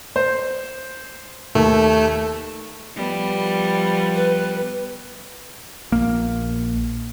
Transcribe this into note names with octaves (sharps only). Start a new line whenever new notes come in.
C5
D#2 A3
F3 G3 B3
B4
A#1 A#3